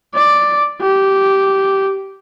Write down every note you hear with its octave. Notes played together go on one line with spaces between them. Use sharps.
D5
G4